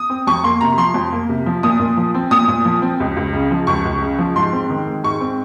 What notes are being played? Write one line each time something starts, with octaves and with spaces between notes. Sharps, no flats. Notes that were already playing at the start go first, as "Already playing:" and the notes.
Already playing: D#6
C4
F2 C#6
A#3 C6
C3 A#5
F3 C6
F2
A#3
C3
F3
A#2 D#6
A#2
F3
C4
A#2 D#6
A#2
F3
C4
C#2
C#2
C#3
F3
C#2 C#6
C#2
C#3
F3
G#2 C6
C4
D#3
G#3
G#2 C#6
C4